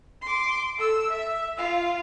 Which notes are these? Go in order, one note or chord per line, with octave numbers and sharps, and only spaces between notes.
C6 D6
A4 E6
E5
F4 F5